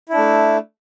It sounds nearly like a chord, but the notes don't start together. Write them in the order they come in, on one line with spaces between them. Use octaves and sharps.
E4 D4 A3